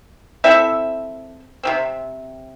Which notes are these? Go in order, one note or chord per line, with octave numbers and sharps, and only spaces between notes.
C4 E4 A4 E5
C3 F3 C4